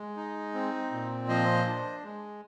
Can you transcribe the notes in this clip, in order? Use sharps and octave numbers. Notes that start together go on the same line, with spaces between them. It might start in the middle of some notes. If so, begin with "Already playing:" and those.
Already playing: G#3
D#4
C4
A#2
F3 C5 D#5
D4
G#3